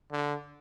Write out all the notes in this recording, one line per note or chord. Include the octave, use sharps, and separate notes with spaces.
D3